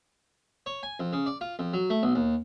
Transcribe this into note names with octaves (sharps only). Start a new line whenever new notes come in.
C#5
G#5
F2
C#3
D5
F4
F2
F#3
A3
B1
D#2